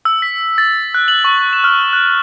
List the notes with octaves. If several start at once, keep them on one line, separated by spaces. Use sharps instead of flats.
E6
B6
A6
F#6
F#7
C#6
E7
F6
F#6